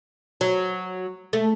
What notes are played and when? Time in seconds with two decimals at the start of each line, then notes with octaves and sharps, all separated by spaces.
0.41 F#3
1.33 A3